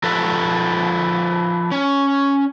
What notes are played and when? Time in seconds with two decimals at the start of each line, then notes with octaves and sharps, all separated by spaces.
0.03 F3 A4 B4
1.71 C#4